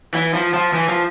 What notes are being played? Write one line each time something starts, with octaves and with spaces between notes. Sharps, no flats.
E3
F3
F3
E3
F3